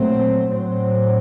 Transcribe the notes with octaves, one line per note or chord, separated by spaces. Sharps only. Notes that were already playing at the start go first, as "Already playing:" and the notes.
Already playing: A#2 F#3 A3 C4
A2 F#3 C4